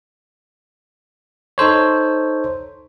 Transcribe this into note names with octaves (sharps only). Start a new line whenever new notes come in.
D#4 A4 C5 C#5